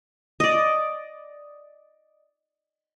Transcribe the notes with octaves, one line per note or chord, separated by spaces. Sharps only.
D5 D#5